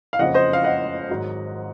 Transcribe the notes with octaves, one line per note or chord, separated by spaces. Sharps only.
F5
F#1 F2 C#3 D#5 F#5
C5 D#5
F5
D#5 F#5
G#1 G#2 F#3